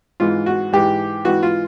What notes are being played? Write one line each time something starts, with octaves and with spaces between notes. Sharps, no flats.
G#2 E3 F4
F#4
G#2 E3 G4
G#2 E3 F#4
F4